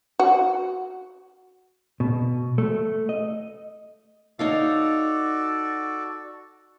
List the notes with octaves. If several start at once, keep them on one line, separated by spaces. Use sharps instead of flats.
F#4
B2
A3
D#5
D#4 F#4 A4 C#5 D5 F5